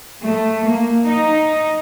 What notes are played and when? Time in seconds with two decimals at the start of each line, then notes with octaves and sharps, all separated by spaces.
0.23 A3
0.66 A#3
1.06 D#4